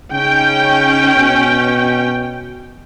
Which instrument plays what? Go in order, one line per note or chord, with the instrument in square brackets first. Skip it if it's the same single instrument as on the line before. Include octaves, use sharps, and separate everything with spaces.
[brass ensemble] C#3 D#4 [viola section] C#4 G5
[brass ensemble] B2